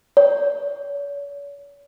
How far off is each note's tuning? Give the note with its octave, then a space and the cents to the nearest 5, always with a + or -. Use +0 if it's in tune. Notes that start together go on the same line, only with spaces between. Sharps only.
C#5 +40